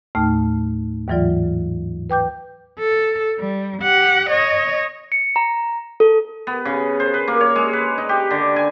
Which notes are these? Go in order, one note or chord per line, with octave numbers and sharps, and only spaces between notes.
D#2 A2 A3 D#4 A5 F6
D#2 G#2 E3 F#3 F4 D5
B4 G5 D6 G6
A4
G3
G4 F#5
C#5 D#5
C#7
A#5
A4
B3
C#3
C5
B4
A#3
C#5
G#3
B4
D#4
G4
D3
G#5